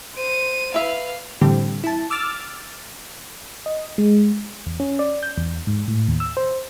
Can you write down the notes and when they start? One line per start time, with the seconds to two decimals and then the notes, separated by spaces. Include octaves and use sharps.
0.15 C5 D#7
0.74 E4 B4 E5 F5
1.41 A2 D3 E3 G3 C4 G4
1.84 E4 A5
2.10 D6 E6 F6 A6
3.66 D#5
3.98 G#3
4.66 E2
4.80 C#4
4.99 D5
5.23 G6
5.38 E2
5.67 G#2
5.88 A2
6.08 D#2
6.20 E6
6.37 C5